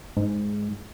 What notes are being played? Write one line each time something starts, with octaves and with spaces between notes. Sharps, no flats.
G#2